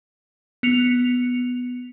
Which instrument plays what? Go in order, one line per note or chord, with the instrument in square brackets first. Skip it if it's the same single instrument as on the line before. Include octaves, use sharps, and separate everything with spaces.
[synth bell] B3 C#7 F7